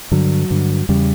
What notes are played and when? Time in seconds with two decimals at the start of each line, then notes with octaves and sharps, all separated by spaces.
0.11 G2 D3 F#3
0.50 G2 D3
0.89 E2 C#3 G3